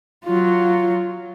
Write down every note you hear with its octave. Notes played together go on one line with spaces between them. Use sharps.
F#3 F4